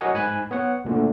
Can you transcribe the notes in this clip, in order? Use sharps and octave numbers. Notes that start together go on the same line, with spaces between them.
F#4 A#4 C#5 D#5 F#5 G#5
G#2 G#5 B5 F#6
B3 C#5 F#5
D2 A#2 D3 A3